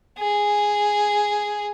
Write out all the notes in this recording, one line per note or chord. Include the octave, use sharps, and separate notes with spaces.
G#4